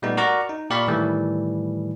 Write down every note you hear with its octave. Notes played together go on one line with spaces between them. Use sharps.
A#2 G3 A3 B3 D#4
F#4 A#4 D5 F#5 A#5 C#6
D#4
A#2 G4 D5 F5 B5 C#6
A2 D#3 E3 G3 A3